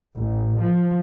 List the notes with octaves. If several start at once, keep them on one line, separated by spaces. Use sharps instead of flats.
A1
F3